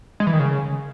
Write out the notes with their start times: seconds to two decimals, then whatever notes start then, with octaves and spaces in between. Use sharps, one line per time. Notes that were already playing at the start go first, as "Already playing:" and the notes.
0.20 G#3
0.27 E3
0.33 D#3
0.39 C#3